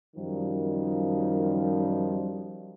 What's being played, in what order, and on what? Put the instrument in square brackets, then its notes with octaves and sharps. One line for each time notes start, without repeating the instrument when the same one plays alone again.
[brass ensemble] F#2 D#3 F3 G3